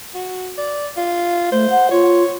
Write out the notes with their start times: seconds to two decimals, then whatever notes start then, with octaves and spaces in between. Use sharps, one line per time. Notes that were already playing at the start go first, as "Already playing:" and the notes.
0.15 F#4
0.58 D5
0.97 F4
1.52 A3 C5
1.70 F#5
1.91 F4 C#5